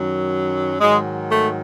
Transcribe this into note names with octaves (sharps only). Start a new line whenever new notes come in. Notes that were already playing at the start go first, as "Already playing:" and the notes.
Already playing: F#2 D#3 F#3
G#2 D#3 F#3 G#3
A3